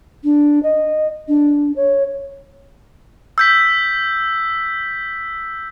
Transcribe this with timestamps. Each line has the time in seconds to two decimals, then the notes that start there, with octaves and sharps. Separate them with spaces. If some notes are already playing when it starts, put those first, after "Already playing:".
0.24 D4
0.63 D#5
1.28 D4
1.76 C#5
3.38 E6 G6 B6